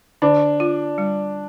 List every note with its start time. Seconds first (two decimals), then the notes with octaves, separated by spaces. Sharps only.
0.22 D3 D4
0.60 F4
0.98 G3